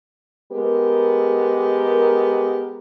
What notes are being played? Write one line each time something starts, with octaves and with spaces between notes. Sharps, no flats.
G#3 B3 G4 A#4